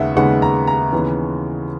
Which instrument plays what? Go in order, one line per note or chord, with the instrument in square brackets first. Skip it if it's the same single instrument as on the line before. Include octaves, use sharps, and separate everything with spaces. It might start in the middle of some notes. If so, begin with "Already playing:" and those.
Already playing: [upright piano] D#2 C#3 G#3 B3 D#4 E5 F#5
D#2 C#3 G#3 B3 D#4 F#5
A#5
A#5
D#2 C#3 E3 B3 D#4